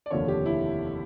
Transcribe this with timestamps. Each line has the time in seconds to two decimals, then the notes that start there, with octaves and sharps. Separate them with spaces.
0.06 D5
0.10 F1 D#2 D3 F3 C#5
0.28 G4
0.46 E4